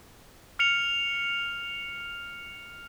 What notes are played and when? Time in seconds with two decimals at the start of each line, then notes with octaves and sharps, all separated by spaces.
0.59 F6 C#7 F7